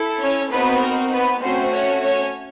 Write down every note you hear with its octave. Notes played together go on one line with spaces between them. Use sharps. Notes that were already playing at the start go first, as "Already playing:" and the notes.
Already playing: E4 A4
C#4 C#5
B3 C4 D#4 F#4 B4
A#4
B3 B4
A3 C4 C#4 F#4 C5
C#4 C#5
C#4 C#5